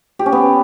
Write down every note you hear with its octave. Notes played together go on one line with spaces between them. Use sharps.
G4
C#4
B3